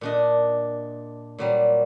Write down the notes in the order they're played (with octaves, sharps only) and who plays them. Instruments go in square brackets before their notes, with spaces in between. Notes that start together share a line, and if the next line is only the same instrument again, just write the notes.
[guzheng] A#2 D4 D#5
A#2 F#3 G3